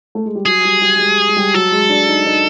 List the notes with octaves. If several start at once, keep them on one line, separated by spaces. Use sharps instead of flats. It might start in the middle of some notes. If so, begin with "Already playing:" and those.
A3
G#3
G3
F#3 G#4
G3
G3
G#3
G3
G#3
G3
F#3 A4
G#3
D4
D#4
D#4